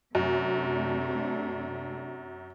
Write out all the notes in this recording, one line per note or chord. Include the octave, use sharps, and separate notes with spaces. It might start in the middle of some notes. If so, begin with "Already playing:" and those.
F#2 C3 A3 D4